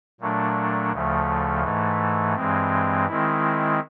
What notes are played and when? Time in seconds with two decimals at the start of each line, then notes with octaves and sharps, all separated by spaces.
0.20 A#2 F#3 A3 D4
0.92 D2 C#3 F3 A3
1.63 G#2 E3 A3
2.35 G2 E3 G#3 C4
3.07 D#3 G#3 C4 E4